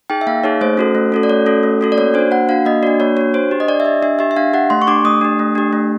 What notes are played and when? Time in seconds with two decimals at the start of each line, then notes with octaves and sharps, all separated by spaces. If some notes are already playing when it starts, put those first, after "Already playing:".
0.10 D#4 G#4 G5
0.21 E5
0.27 A#3 F5
0.44 D#4 G#4 C#5
0.61 A3 C5
0.77 C#4 F#4 A4
0.95 A3
1.12 C#4 F#4 A4
1.23 D5
1.29 A3 C#5
1.46 C#4 F#4 A4
1.63 A3
1.81 C#4 F#4 A4
1.92 D5
1.98 A#3 C#5
2.14 D4 F#4 C5
2.31 A#3 F#5
2.49 D4 F#4 F5
2.66 A#3 D#5
2.83 D4 F#4 D5
3.00 A#3 C#5
3.17 D4 F#4 C#5
3.34 D4 C5
3.51 G4
3.60 D#5
3.68 D4 D5
3.80 E5
3.85 G4 D#5
4.03 D4 E5
4.19 G4 E5
4.31 E5
4.36 D4 F5
4.54 G4 F#5
4.70 A3 C6
4.82 C#6
4.87 D4 G4 D6
5.05 A3 D#6
5.21 D4 G4
5.39 A3
5.55 D4 G4
5.73 A3